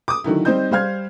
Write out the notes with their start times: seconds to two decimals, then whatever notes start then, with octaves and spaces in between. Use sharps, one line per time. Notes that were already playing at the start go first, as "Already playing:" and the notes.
0.08 D6 D#6
0.24 D3 D#3 F#3 E4
0.45 G3 C4 D#4 C5 D#5 G6
0.71 G3 C5 F5 F6 G#6